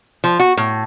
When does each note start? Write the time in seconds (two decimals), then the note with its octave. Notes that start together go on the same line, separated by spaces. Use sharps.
0.24 F3
0.40 F#4
0.57 A2